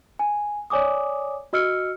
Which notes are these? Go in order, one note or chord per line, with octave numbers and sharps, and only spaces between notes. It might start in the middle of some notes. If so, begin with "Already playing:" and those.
G#5
C#5 D5 G#5 D6 D#6
F#4 D#5 E6 F6 C#7